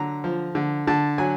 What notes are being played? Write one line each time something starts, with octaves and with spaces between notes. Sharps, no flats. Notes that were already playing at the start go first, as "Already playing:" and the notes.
Already playing: D3 F#3 A#5
F3
D3
D3 A5
F#3 G#5